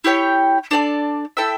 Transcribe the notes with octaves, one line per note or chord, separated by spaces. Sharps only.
E4 G4 C#5 G5
D4 A4 D5 A5
E4 A4 E5 G5